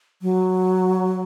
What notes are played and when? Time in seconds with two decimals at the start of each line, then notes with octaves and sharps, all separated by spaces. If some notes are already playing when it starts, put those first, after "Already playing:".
0.22 F#3